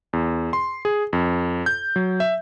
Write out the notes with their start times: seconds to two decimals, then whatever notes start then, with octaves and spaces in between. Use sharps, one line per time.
0.13 E2
0.53 C6
0.85 G#4
1.13 F2
1.66 G6
1.96 F#3
2.20 E5